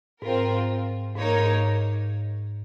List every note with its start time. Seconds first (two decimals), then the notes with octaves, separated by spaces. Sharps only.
0.22 G#2 C4 F4 A#4
1.16 G#2 A#3 D#4 A#4 C#5
1.39 G#2